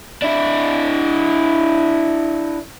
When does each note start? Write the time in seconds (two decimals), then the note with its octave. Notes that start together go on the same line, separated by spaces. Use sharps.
0.22 D4 E4